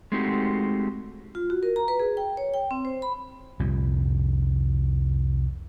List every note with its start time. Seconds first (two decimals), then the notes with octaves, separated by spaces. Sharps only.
0.12 G#3 A3 C4 D#4 F#4 G4
1.35 F4
1.50 F#4
1.63 A#4
1.76 A#5
1.88 B4
2.00 G#4
2.17 G5
2.37 C#5
2.54 G5
2.71 C4
2.85 C5
3.02 B5
3.59 C2 F2 A#2 G3